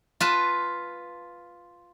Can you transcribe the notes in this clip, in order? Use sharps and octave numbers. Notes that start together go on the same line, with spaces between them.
F4 B4 A5